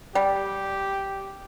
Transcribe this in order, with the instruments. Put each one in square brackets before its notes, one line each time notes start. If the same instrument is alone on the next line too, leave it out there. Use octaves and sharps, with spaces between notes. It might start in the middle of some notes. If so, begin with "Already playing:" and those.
[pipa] G3 [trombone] G4